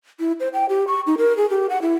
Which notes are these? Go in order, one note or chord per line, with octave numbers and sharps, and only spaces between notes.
E4
C5
G5
G4
C#6
D#4
A#4
G#4
G4
F#5
E4